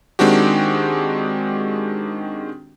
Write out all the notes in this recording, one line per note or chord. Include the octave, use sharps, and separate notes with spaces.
D#3 G#3 C4 D4 F#4 G4